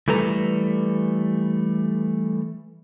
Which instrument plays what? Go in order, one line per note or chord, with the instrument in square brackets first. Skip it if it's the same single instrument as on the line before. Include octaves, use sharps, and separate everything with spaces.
[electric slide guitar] E3 G3 A3 A4 B4 A#5